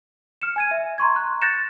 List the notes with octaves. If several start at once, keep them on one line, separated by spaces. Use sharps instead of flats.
F6 C#7 E7
G#5 G#6 D#7
E5
A#5 C6 C#6 G#6
F#6
F#6 G6 A6 A#6 C#7 E7